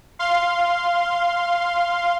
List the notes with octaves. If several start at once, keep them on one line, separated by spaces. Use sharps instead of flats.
F5 C6